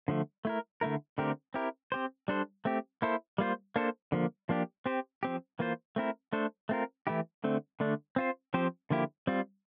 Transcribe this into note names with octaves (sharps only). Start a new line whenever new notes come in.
D3 F3 A3
A3 E4 A#4
D3 A3 E4 A#4
D3 A3 C4 G4 A#4
C4 E4 G4 A#4
C4 G4 C5
G3 D4 A4 C5
A3 C4 G4
A#3 E4 A4 C5
G3 A#3 F4 C5
A#3 D4 A4 C5
D3 F3 A#3
F3 A#3 D4 G4
C4 G4 C5
F3 C4 G4
E3 A#3 F4 C5
A3 C4 E4 A#4
A3 D4 A4 C5
A3 C4 F4 A#4
E3 A3 E4 G4
D3 A3 C4
D3 A3 D4
C4 F4 C5
F3 C4 G4 C5
D3 F3 A#3 E4 G4
G3 C4 F4